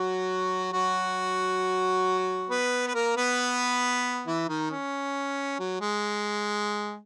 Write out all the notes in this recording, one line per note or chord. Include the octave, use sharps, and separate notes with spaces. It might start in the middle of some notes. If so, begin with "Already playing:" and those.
Already playing: F#3 F#4
F#3 F#4
B3 B4
B4
A#3 A#4
B3 B4
E3 E4
D#3 D#4
C#4
F#3
G#3